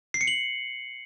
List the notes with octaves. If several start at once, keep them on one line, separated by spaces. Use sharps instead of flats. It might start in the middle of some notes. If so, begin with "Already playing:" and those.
C7
C#7
F#7